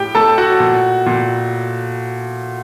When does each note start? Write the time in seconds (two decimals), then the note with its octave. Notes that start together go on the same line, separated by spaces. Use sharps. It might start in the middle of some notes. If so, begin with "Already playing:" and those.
Already playing: A2 G4 G5
0.15 A3 A4 A5
0.38 F#4 F#5
0.60 A#2
1.06 A#2